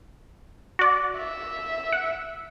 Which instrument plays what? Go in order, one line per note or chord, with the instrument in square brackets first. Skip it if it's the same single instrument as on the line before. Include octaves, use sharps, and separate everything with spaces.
[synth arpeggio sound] F#4 D5
[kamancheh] E5
[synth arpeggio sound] F#5